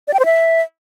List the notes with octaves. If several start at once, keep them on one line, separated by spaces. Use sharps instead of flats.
D5
G5
C5
E5